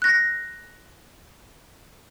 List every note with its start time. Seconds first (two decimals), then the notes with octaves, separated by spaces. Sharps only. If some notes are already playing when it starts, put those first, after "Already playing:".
0.02 F#6 A#6